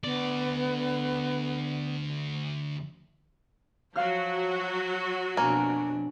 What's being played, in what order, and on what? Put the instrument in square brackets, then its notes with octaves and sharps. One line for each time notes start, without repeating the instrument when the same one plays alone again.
[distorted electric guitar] D2 D5 [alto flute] B3
[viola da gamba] F3 [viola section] F#3 F#4 [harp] F5 F6
[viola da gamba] F2 B2 D4 [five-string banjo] A#3 [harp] G#5